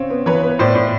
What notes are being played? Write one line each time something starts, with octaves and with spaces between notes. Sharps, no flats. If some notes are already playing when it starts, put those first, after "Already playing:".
Already playing: C#3 C4 C#5
B3
E3 B4 C#5
B3
A2 C5 D5
A2